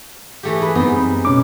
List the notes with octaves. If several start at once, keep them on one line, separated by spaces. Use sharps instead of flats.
E3 A3 G4
G#4 B4
F#2 G3 B3 C4 D#4
B2 C#4 D6